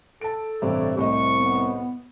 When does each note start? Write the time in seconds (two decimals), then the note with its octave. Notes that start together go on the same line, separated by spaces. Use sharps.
0.21 A4 A5 D7
0.62 A1 G2 C3 G4 C#5 D5
0.97 C2 A2 C5 D#5 C#6
1.38 B3